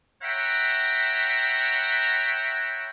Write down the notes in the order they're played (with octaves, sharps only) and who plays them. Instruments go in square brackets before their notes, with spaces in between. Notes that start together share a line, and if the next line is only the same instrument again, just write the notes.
[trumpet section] C#5 E5 F#5 G5 A#5 B5